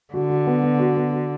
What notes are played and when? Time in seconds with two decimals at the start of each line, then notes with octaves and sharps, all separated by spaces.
0.14 D3 F#4
0.30 F#4
0.47 B3
0.63 B3
0.79 F#4
0.96 B3
1.13 F#4